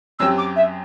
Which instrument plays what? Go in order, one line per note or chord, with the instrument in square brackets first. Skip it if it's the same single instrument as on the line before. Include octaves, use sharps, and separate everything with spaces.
[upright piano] F#2 F#3 C4 G4 [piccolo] E6
[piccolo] D6
E5